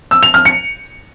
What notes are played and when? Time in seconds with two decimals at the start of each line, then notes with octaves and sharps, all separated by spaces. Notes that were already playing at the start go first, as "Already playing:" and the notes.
0.11 E6
0.23 F7
0.34 F6
0.45 C#7